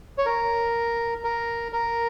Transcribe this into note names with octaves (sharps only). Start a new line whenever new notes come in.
C#5
A#4
A#4
A#4